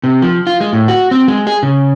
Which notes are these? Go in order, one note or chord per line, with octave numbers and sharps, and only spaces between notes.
C3
F3
F4
G#3
A2
F#4
C4
G#3
G#4
C#3